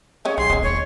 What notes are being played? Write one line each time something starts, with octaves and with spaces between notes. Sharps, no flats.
G#3 C#4 G4 C#5
B1 G#4 C6
E1 G#3 C#4
D#2 C#5